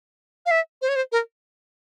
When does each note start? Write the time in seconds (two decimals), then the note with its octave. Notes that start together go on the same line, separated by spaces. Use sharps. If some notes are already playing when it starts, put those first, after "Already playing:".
0.46 F5
0.51 E5
0.82 C5
0.89 C#5
0.96 C5
1.12 A#4